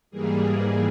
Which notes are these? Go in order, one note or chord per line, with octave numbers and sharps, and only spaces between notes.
G#2 E3 G3 A#3 G#4